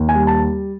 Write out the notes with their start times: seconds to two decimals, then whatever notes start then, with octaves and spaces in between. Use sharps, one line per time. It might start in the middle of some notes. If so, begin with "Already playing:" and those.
Already playing: D#2
0.09 G#5
0.15 G3
0.27 A5